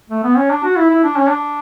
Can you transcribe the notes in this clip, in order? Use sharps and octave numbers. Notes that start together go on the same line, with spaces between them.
A3
B3
C#4
D4
F#4
E4
E4
D4
C#4
D4